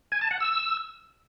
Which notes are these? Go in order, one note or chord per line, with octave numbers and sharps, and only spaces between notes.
G#5
A5
F#5
E6